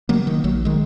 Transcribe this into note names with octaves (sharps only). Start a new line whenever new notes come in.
C#3 F#3 A#3
D#3
A#1 F#3
D#3 G#3